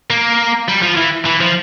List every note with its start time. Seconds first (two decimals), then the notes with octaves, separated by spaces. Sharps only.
0.10 A#3
0.68 G3
0.82 F3
0.96 E3
1.25 E3
1.40 F3